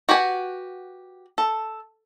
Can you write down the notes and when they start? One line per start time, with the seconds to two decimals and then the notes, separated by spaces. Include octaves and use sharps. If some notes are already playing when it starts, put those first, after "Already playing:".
0.09 F#4 G4 B4 F#5 G#5
1.38 A4